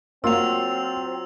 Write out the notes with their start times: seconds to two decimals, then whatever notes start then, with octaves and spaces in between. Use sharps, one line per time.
0.24 F#3 A#3 C4 F4 E6 F7